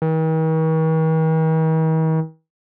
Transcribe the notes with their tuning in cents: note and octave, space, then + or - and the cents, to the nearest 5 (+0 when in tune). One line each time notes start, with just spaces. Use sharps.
D#3 +45